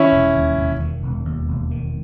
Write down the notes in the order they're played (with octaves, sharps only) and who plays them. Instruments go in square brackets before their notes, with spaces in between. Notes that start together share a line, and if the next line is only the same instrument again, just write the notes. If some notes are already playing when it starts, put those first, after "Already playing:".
Already playing: [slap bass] D#3 [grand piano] C#4 E4
[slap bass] E1
D#2
E1
D#3
E1
D#2
E1
D#3